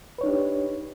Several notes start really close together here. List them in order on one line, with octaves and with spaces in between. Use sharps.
B4 C#5 D#4 D4 G4